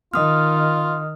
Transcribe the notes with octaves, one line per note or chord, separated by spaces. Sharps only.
D#3 F4 D#5 D#6 F6